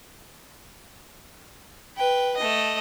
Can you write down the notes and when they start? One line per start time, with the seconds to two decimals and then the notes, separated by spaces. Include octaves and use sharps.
1.97 B4 G5
2.37 A3 D#5